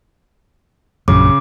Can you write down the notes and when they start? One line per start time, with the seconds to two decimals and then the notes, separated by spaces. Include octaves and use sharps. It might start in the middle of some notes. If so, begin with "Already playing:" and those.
1.08 A#1 F#2 C#3 D6